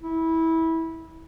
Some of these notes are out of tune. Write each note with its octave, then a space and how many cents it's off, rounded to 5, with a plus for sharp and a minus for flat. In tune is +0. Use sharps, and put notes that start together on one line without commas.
E4 -20